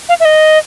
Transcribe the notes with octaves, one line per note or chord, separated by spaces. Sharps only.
F5
E5
D#5